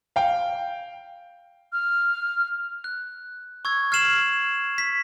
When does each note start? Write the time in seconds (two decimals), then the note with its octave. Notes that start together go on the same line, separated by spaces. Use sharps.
0.16 F5 G5
1.73 F6
2.84 F#6
3.65 C#6 E6 G#6
3.92 F6 G#6 C7 E7 F#7
4.78 B6